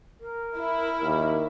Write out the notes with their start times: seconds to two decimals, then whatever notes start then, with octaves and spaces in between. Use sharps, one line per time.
0.21 A#4
0.57 E4
1.03 D#2